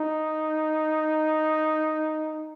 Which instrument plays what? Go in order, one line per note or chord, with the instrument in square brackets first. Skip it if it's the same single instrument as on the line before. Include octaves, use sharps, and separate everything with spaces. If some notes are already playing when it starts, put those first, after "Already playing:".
Already playing: [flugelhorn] D#4